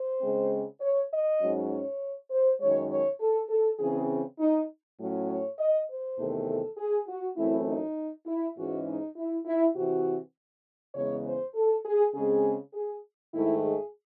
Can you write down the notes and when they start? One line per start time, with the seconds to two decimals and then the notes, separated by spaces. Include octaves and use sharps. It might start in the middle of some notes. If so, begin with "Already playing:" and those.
Already playing: C5
0.21 C#3 G#3 C4
0.81 C#5
1.12 D#5
1.41 G#2 F#3 C#4
1.71 C#5
2.31 C5
2.60 F#2 D#3 G#3 C#5
2.90 C#5
3.20 A4
3.49 A4
3.79 C#3 E3 C4 G#4
4.39 D#4
5.00 A2 F#3 C#4
5.29 C#5
5.59 D#5
5.89 C5
6.18 E2 C3 D#3 A3
6.48 A4
6.78 G#4
7.08 F#4
7.37 F#2 E3 A3 C4 E4
7.67 D#4
8.27 E4
8.57 G#2 E3 G#3 C#4 F#4
8.87 D#4
9.17 E4
9.46 E4
9.76 C3 E3 C4 F#4
10.95 E2 C#3 G#3 C#5
11.25 C5
11.55 A4
11.86 G#4
12.15 C#3 G#3 C4 G#4
12.74 G#4
13.34 G#2 D#3 A3 E4
13.63 G#4